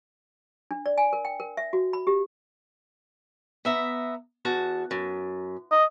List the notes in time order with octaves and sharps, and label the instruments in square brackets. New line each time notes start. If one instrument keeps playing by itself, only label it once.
[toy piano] D4
D5
G#5
A#4
G5
A#4
E5
F#4
B5
G4
[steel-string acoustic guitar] B3 E5 A#5
E2 F#4 A5
F#2
[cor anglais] D#5